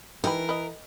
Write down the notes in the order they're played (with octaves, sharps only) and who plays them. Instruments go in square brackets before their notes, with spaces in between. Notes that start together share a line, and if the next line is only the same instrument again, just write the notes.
[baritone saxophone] E3 [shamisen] D#4 G4 B4 [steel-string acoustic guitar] A#4
[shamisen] B4 D#5